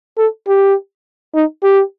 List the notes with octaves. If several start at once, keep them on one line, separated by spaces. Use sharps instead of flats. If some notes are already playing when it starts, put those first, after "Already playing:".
A4
G4
D#4
G4